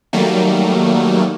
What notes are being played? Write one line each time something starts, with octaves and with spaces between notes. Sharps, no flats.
D#3 F#3 G3 A3 A#3